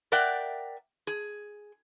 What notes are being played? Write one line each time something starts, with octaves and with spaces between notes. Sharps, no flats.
A#4 D5 E5 F#5 G5
G#4